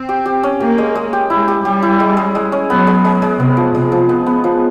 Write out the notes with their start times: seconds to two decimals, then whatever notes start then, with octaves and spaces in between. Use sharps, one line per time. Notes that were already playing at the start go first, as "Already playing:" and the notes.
Already playing: C4
0.09 G4
0.26 G4
0.43 C#4
0.60 A#3 G4
0.78 G#3
0.95 G#3
1.13 G4
1.30 G#3 E4
1.48 G4
1.65 G3 G4
1.82 E4
2.00 G#3
2.17 G#3
2.35 G#3
2.52 C#4
2.70 F#3 B3
2.87 G#3
3.05 G#3
3.22 G#3
3.39 C3 B3
3.57 F3
3.74 C3 G#3
3.92 F3
4.09 B3
4.26 B3
4.44 F3